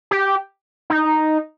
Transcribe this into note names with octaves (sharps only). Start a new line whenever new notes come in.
G4
D#4